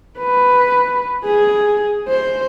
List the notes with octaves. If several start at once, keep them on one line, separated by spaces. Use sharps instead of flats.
B4
G#4
C5